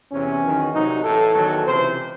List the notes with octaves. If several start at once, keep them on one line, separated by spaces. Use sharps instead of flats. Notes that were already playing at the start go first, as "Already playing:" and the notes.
E2 C3 E3 C#4
E2 D#3 F#3
C2 C3 F#3 D#4
A1 A2 E3 A4
E2 D#3 F#3
C#2 C3 E3 C5